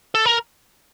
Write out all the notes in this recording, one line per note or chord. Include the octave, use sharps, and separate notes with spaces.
A4
A#4